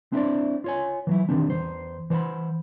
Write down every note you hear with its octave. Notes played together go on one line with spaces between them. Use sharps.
C4 D4 E4 B4 C5 D5
F4 C#5 G#5
E3 F#3 E4
D#3 G3 A3 C4 D4
E2 A#2 C5
E3 C5 C#5 F#5 B5